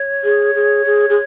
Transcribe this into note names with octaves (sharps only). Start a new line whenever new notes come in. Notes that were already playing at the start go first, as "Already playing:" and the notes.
Already playing: C#5
G#4
G#4
G#4
G#4